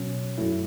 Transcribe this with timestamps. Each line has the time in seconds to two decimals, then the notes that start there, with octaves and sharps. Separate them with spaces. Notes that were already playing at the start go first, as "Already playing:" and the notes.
Already playing: B2 F#3 C#4
0.38 F#2 F#3 A3 E4